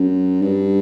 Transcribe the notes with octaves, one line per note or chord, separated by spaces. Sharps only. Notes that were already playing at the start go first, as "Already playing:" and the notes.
Already playing: F#2
G2